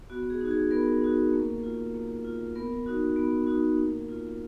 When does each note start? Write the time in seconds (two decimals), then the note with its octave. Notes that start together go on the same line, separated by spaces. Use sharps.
0.10 B3 F#4
0.30 G#4
0.41 D#4 F#4
0.51 G#4
0.71 B3 A#4
1.01 D#4 F#4
1.33 A#3
1.64 F4
1.94 A#3
2.25 F4
2.55 B3 A#4
2.86 D#4 F#4
3.16 B3
3.47 D#4 F#4
3.77 A#3
4.09 F4